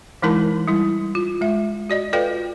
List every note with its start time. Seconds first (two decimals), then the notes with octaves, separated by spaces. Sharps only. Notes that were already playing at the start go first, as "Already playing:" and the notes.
0.22 E3 G#3 D#4 E4 A#4 A5
0.68 G3 E4
1.15 F4
1.41 G#3 E5
1.90 F#4 D5 D#5
2.13 F4 A4 B4 D5 F5 G5